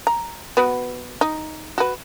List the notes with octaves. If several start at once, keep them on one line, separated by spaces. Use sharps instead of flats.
A#5
B3 F#4 B4
D#4
F#4 B4